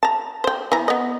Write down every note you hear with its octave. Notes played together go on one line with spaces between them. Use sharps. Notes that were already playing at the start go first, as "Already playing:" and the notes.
A5 A#5
C5 G5
E3 B3 A#5
B3 D#5